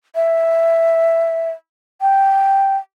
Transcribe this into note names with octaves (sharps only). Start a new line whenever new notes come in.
E5
G5